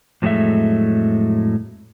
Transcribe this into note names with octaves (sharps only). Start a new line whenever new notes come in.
F2 A2 F#3 G#3 A3 E5